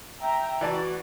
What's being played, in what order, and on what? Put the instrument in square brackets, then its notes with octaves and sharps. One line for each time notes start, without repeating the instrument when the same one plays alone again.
[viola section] E5 G5 A#5
[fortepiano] E3 D5 A5 [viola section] F#4